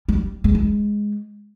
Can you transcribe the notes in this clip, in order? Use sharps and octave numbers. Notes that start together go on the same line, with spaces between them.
G3
G#3
G#3